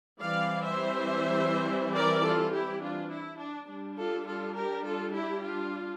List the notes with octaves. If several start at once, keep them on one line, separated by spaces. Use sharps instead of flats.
E3 G3 C4 D5 F5
C5 E5
A#4 D5
F4 A4
E4 G4
D4 F4
E4
D4
G3 D4
F4 A4
F4 A4
G4 A#4
F4 A4
E4 G4
D4 F4